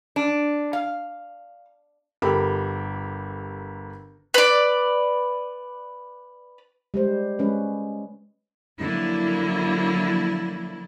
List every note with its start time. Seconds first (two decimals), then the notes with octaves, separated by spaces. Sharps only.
0.16 D4
0.73 F5
2.22 G1 G4 A4 A#4 B5
4.34 B4 D5
6.94 G3 G#3 C5
7.39 G#3 C#4 B4
8.80 D3 F3 F#3 A#3 E4